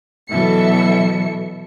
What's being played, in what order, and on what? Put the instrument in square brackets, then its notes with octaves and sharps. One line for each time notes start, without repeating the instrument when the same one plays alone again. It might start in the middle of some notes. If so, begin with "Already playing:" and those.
[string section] B2 E3 F#3 A4 E5 C#7